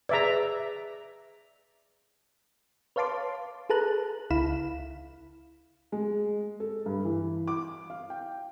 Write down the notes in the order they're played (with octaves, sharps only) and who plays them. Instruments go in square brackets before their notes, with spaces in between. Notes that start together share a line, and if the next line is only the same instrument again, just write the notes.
[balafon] G#4 B4 [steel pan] D5 E5 A#5
[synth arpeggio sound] B4 C#5 F5 A5 C6 D6
G#4 A4 B4 A5 A#5 F#6
C#2 E4 F5 B5 E7
[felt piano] G#3
A4
G2
E3
D6
F5
G5